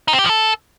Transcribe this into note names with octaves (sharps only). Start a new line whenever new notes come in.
D#4
C4
G4
F3
A4